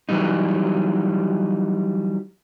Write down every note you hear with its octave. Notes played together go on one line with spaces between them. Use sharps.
E3 F#3 G3 D#4